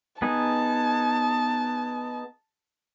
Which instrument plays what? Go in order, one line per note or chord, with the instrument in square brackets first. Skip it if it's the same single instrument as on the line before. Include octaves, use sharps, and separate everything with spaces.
[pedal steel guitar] B3 D#4 G#4 [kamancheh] A5